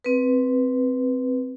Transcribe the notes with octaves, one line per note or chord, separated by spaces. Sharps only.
C4 B4